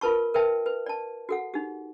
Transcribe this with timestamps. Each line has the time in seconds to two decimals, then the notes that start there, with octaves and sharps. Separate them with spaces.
0.01 F4 A#4 B4 A5 C#6
0.34 A#4 B4 E5 G5 A5
0.66 B4
0.86 D5 A5
1.29 F#4 A4 F#5
1.54 D#4 G4